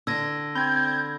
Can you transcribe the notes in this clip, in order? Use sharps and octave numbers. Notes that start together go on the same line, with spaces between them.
D3 E6 G#6 A#6
C4 B5 G6 G#6